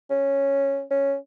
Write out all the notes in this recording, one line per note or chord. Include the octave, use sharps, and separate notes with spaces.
C#4
C#4